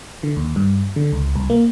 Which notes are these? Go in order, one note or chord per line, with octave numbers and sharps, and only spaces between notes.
D3
D#2
G2
D3
C#2
C2
A#3